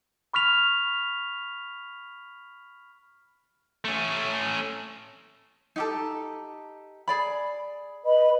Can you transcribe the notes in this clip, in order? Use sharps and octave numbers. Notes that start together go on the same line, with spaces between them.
B5 C#6 F6 B6 F7
A3 C#4
D#4 G4 A4
G#4 D5 B5
B4 D#5 B5